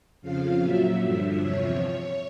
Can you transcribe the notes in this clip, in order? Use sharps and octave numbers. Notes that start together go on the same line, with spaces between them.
F2 C#3 F3 F5
A#2 F#3 E5
G2 D3 F3
E2 C3 F3 C#5